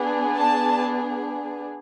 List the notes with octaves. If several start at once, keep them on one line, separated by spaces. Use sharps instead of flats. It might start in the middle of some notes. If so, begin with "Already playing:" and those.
Already playing: B3 D4 G#4
A5